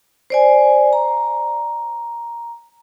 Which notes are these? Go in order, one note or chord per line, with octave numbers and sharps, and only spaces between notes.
C5 D5 G#5
A#5